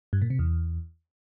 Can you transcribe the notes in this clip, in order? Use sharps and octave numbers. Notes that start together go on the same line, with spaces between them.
G2
A#2
C3
E2